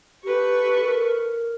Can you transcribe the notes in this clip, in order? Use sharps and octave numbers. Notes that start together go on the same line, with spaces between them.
G4 A4 B4 C#6
A#4